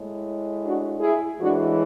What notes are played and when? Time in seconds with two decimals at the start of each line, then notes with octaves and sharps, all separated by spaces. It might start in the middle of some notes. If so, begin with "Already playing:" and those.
Already playing: A2 G#3
0.62 D4 F#4
1.00 E4 G#4
1.38 A2 E3 G#3 D4 F#4